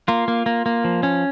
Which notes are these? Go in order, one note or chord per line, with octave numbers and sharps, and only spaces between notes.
A#3 F4
A#3
A#3
A#3
F3
C#4